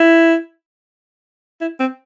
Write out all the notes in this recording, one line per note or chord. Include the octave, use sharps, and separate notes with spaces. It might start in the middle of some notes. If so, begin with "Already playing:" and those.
Already playing: E4
E4
C4